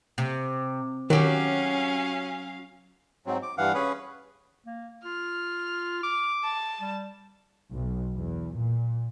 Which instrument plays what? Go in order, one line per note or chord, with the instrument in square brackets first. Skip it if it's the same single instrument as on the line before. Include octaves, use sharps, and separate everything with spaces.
[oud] C3
[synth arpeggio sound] D#3 [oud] F#3 G4 [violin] C#4 F5
[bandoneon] G#2 F#3 C4
D6
G2 E3 F5 F#5
C#4 G#4 B4
[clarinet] A#3
[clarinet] F4 [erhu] F6
[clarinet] D6
[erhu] A5
[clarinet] G3
[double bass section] B1
E2
A#2